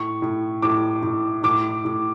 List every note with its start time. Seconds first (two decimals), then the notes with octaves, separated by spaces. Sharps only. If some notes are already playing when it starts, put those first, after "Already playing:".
Already playing: A2 C#6
0.22 A2
0.62 A2 D6
1.03 A2
1.43 A2 D6
1.85 A2